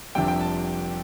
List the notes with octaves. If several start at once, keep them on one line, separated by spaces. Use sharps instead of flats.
F1 F2 C3 G3 D4 G5
G5
A5